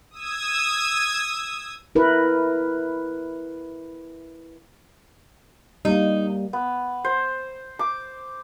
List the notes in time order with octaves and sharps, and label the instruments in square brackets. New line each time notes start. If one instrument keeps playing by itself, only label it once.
[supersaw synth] D#6 E6 G#6
[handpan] E4 A#4 B4
[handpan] G3 A#3 [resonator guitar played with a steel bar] D#4
[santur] B3
C5
D6